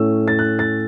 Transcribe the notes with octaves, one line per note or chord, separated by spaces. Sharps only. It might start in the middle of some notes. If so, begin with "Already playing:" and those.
Already playing: A2 A3 C#4 E6
A6
F#6
A6